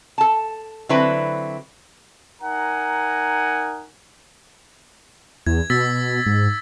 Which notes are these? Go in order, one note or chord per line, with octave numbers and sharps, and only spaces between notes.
A4 A5
D3 F#3 C4 E4 B4
D#4 A#4 F#5 G#5 A#5
E2 G#6
B2 E6 A6 B6
G#2